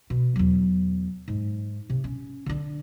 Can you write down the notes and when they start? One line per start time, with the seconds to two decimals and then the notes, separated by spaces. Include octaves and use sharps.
0.10 B2
0.36 E2 F#3
1.28 G#2
1.90 C3
2.04 C#4
2.46 D3 D4